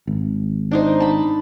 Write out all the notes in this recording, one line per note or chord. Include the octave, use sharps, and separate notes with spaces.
G#1
D4 D#4 C5
A5 B5